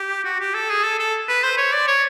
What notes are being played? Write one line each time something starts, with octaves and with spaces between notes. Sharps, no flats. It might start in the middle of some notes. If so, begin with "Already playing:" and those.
Already playing: G4
F#4
G4
A4
G#4
A4
A4
B4
C5
C#5
D5
C#5